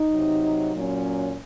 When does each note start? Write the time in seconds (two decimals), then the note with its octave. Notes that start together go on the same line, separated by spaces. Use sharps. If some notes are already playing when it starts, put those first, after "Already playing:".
Already playing: D#4
0.12 C3 F#3
0.74 A#2 F#3 C#4